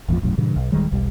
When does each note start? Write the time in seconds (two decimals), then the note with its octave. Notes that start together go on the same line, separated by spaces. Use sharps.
0.09 G#1 E2 A2 F3
0.22 D#1 B1 F#2 A2
0.38 G2 A#2 C#3 E3
0.56 B1
0.72 D1 D#3 G3 G#3
0.91 E1 B1 G3